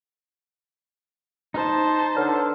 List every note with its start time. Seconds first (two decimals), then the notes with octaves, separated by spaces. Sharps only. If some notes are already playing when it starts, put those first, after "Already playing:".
1.54 D#4 C5 A5
2.17 D3 B4 C#5 F6